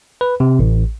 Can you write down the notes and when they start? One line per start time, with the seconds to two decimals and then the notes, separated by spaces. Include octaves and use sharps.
0.21 B4
0.40 C3
0.59 A1